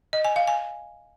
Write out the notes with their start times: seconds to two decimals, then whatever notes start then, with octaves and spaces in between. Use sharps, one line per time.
0.13 D#5
0.25 G#5
0.36 F5
0.47 G#5